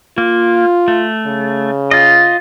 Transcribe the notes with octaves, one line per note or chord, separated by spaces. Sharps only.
A#3 F4
A3
C#3
F4 D#5